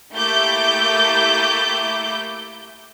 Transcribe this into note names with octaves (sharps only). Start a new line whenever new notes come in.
A3 A#3 E4 G4 D6 G6